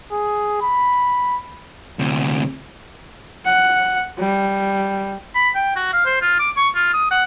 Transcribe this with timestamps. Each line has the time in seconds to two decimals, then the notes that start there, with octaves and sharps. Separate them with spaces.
0.12 G#4
0.61 B5
1.99 D2 C3
3.46 F#5
4.18 G3
5.35 B5
5.55 G5
5.76 F#4
5.93 F5
6.06 C5
6.22 F4
6.39 D6
6.57 C#6
6.75 F4
6.93 D#6
7.11 F#5